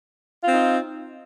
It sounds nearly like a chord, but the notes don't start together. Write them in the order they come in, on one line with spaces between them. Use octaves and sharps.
F4 C4 D#4